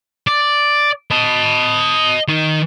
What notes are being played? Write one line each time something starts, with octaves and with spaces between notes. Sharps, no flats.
D5
D#5 A5
D#3 D#4